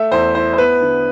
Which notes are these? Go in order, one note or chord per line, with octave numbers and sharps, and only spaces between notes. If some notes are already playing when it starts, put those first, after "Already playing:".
Already playing: A3 E5
E2 C5
E4 C5
C5
B3 B4
D3